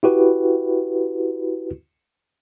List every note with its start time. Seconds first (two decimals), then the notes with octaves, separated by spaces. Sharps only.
0.03 E4 F#4 G4 B4